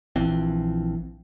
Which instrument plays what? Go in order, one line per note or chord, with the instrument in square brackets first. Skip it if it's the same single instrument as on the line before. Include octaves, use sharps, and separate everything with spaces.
[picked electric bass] A#1 E3 F3 C4